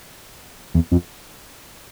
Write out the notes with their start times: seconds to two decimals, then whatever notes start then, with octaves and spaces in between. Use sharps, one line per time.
0.75 E2
0.92 F2